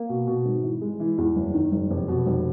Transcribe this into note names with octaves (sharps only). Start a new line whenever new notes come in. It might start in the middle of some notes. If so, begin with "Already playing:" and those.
Already playing: A#3
B2
B2
G#1
E3
G#3
E3
E2
F#1
D#3
F#1
F1
B2
F1